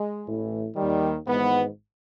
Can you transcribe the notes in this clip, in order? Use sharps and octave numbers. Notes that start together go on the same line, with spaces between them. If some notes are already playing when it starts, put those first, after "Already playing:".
Already playing: G#3
A1 A2 E3
D#2 D#3 G3
G#1 G#2 E3 B3